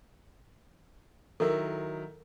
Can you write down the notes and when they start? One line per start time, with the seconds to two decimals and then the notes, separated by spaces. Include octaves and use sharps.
1.40 D#3 F#3 E4 A4 A#4